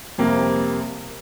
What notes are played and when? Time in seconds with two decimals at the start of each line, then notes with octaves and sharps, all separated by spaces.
0.18 F2 C3 G3 A#3